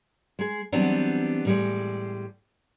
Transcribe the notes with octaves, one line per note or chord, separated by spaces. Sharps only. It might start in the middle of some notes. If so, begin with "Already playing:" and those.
G#3 G#4
E3 F#3 G3 B3 C4 D4
A2 G3 G#3